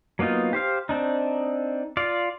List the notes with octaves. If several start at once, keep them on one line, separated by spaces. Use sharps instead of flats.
F#3 A#3 B3 D#4 F4
G4 C5 F5
C4 D4 D#4
F4 D5 F5